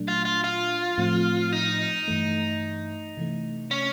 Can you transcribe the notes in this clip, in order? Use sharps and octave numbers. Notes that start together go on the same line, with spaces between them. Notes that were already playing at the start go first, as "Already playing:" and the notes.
Already playing: A#2 F#3 A3 D4
F4
F4
F4
A2 F3 A3 C4
D#4
G2 E3 A3
C3 E3 A3
C#4